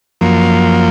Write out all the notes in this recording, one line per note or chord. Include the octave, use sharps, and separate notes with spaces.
F#2 F3 A#3